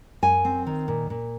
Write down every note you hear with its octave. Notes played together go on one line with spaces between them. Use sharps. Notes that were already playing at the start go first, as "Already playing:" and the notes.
F#2 G#5
C4
D#3
A#2
A#2